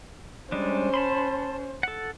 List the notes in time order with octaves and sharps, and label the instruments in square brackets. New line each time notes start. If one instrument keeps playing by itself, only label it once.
[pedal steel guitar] G3 G#3 D4 [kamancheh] C#4 C5
[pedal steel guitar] A5 B5 C6
A4 F#5